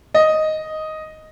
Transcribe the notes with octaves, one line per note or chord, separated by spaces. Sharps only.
D#5